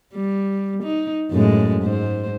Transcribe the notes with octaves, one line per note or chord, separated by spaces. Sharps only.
G3
D#4
F#2 A2 G#3
G#2 C5